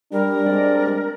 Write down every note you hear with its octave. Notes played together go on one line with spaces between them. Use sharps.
G3 D4 A#4
G3 G#3 C4 D5